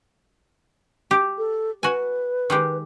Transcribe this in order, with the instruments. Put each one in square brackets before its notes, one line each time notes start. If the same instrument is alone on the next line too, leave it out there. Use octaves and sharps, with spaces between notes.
[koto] G4
[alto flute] A4
[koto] F#4 G#5 [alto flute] B4
[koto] D#3 G#3 G4